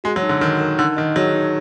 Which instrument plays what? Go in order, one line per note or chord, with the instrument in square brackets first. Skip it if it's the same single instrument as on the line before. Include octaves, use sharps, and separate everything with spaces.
[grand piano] G#3 [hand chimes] F#4
[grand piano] F#3
[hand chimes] D#4
[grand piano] D3
[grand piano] D#3 [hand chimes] D#4
[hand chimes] A#4
[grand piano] D3 [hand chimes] D#4
[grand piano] D#3 [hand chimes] D#5
[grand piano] F#3 [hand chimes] G#4
[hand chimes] D#4